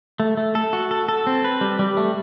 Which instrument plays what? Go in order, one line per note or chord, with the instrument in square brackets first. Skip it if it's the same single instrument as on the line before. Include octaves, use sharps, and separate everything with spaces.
[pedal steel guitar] A3
A3
A4
F#4
A4
A4
C4
B4
G3
G3
A3